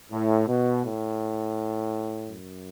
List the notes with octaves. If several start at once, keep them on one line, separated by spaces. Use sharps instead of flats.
A2
B2
A2
F#2